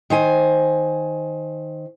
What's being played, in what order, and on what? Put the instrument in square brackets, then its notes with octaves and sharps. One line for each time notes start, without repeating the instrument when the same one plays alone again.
[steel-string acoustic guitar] D#3 C5 G#5